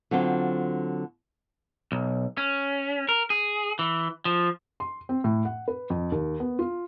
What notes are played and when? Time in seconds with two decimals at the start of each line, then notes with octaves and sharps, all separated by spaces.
0.11 D3 F#3 C4 F4 C5
1.92 B1
2.38 C#4
3.09 A#4
3.30 G#4
3.79 E3
4.25 F3
4.80 C6
5.09 C4
5.24 A2
5.45 F#5
5.68 B4
5.90 F2
6.12 D#2
6.40 B3
6.59 F4